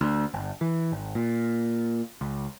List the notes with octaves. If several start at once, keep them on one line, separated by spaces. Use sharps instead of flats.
D2
G1
E3
G#1
A#2
C#2